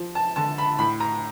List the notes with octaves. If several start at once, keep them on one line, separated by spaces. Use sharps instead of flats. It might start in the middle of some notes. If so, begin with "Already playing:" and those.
Already playing: F3
A5
D3 A5
B5
A2 B5
A#5